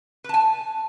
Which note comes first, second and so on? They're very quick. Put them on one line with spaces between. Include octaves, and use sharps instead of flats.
B4 A5 G#5